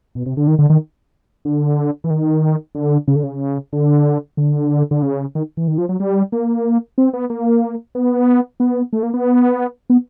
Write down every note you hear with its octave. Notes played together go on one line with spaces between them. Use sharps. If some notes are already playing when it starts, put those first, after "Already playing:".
B2
C3
D3
D#3
D3
D#3
D3
E3
D#3
D3
C#3
D3
C#3
D3
D3
D3
C#3
D#3
E3
D#3
F3
F#3
G3
A#3
C4
B3
A#3
B3
B3
A3
A#3
B3
B3